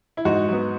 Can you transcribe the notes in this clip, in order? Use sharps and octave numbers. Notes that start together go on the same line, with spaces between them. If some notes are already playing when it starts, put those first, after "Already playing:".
E4
G#2 D#4 F#4
F#3 B3